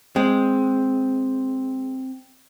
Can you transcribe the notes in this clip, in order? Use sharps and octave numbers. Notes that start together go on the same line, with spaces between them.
G#3 C4